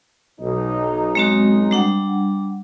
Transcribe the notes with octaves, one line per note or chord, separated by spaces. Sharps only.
B1 D#4
G#3 C4 F#4
G3 D4 F#5